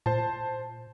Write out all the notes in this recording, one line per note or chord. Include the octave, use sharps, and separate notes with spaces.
A#2 C5 A5